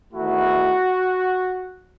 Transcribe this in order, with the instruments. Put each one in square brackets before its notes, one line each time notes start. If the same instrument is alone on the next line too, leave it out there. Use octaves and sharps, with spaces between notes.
[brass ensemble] E2 D#3 A3 E4 F#4